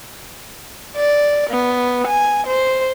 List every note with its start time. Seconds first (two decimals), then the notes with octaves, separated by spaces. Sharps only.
0.96 D5
1.50 B3
2.07 G#5
2.47 C5